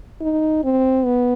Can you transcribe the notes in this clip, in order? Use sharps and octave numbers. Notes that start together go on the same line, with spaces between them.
D#4
C4
B3